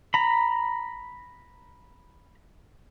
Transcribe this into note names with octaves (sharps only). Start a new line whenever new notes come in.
A#5 B5